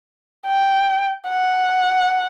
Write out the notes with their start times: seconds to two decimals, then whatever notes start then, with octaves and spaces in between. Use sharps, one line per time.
0.47 G5
1.28 F#5